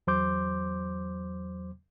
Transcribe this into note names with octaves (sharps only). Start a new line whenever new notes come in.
E2 F#3 C5 C6 D6 G6